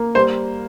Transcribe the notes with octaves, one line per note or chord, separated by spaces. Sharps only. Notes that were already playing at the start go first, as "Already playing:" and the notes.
Already playing: A#3
G3 C5